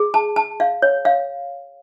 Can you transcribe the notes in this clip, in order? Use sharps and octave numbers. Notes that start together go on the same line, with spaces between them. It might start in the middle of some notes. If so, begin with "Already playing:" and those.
Already playing: G#4
A5
A5
F5
C#5
F5